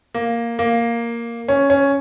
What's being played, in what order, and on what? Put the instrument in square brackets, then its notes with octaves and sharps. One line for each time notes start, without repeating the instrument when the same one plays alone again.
[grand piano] A#3
A#3
C#4
C#4